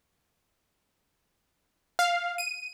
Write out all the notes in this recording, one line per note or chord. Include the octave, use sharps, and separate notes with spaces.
F5
D#7